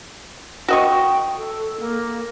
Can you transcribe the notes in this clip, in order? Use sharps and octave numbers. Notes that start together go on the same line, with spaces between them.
F#4 D#5 G5 C#6
A4
A#3